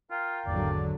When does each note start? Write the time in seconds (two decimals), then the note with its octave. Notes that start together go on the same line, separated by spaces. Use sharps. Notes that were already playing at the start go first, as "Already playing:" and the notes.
0.11 F4 A#4 F5 G5
0.47 G#1 E2 D3 F#3 D5